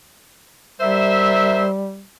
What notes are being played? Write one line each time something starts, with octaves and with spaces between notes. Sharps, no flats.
G3 A#4 C5 E5